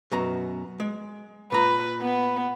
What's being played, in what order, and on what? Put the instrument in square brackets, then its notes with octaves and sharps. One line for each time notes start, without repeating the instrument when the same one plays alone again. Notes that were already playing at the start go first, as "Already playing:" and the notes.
[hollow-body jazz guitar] F#2 B2 A#5
G#3
[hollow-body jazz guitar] A#2 A#5 [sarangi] B4
[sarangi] B3